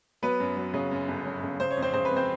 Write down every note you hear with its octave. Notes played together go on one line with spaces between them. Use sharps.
F#3 B3 B4
F#2
F#3
C#3
F#2
G1
F#2
C#3
C#3 C5
C#5
F2
C4 C5
C#3 C5
B4
F2
C4 C5